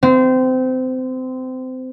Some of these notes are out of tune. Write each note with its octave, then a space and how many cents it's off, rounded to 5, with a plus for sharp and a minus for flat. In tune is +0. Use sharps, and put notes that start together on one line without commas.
C4 -25